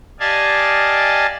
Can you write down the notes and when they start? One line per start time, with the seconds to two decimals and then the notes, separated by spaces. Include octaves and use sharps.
0.20 G4 D5 D#5 F5 G#5 A5